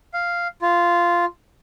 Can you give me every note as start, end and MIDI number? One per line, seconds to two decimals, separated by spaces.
0.14 0.48 77
0.62 1.25 65